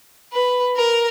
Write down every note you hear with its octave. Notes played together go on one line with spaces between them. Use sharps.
B4
A#4